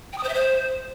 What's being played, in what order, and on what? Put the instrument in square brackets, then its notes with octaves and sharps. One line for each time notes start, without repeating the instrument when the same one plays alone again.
[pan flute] G5
D#6
C5
E5
C5